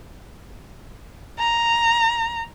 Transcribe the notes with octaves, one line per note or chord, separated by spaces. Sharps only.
A#5